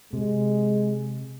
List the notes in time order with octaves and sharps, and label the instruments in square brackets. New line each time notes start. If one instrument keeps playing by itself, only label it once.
[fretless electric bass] C3 [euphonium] G#3